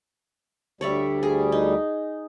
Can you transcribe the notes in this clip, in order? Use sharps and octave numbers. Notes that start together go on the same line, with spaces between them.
D2 G3 C#5 D5 E5
G#4
D#4